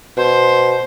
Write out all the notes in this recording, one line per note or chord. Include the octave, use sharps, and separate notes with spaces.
B2 C5